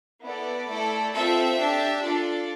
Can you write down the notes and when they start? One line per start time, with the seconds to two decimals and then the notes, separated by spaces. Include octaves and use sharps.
0.24 B3 E4 A4 D5
0.68 A3 E4 A4
1.14 C4 F4 A4 E5
1.59 D4 G4
2.03 D4 F4 A4 D5